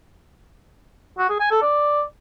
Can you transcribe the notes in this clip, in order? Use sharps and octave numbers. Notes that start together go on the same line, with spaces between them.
F#4
G#4
G#5
A4
D5